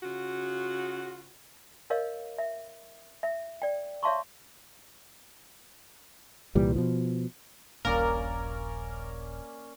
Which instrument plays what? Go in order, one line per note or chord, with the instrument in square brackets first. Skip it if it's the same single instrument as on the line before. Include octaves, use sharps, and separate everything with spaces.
[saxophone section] C#3 F4 F#4
[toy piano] A#4 C#5 D#5 F5
E5
E5
D5 G5
C#5 E5 F5 A5 C6 C#6
[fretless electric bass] C2 A#2 E3 G3
B2 F3
[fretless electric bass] D#1 A#1 A#2 [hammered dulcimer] A#3 C#4 D5 [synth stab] A#4